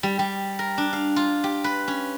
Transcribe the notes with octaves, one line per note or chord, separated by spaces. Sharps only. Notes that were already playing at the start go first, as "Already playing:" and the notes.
G3
G3
A#4
D4
F5
F4
G4
B4
C#4